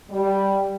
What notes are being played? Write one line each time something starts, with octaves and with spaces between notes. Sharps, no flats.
G3